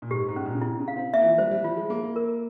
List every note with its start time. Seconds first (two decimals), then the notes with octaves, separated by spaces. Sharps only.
0.02 A#2
0.11 G#2 G4
0.28 G#2
0.36 C#4
0.45 A#2
0.54 C#3
0.62 C3 E4
0.80 C#3
0.88 F5
0.96 C4
1.14 A#3 E5
1.21 E3
1.26 F3
1.38 G3 C5
1.51 G3
1.64 F3 F4
1.77 G#3
1.90 A#3 G#4
2.03 A#3
2.16 A#4